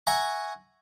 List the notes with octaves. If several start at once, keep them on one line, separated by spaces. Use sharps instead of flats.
E5 F#5 G#5 A#5 C#6